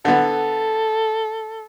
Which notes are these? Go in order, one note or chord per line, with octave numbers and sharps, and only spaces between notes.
D3 B3 A4